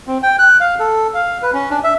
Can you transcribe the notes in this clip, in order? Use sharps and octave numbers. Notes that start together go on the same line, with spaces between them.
C4
G5
F#6
F5
A4
F5
B4
C#4
D4
E5